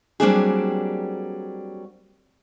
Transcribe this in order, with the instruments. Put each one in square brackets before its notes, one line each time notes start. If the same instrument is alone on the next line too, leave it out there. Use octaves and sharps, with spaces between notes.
[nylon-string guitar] F#3 G3 A#3 C4 D4 G#4